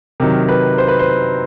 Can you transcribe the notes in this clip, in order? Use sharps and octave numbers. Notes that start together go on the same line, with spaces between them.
C3 D#3 F#3 A#4
B4
C5
B4
C5